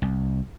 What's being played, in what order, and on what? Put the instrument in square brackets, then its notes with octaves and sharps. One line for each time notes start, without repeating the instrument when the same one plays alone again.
[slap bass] C2